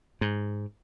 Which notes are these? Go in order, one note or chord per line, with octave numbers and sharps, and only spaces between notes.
G#2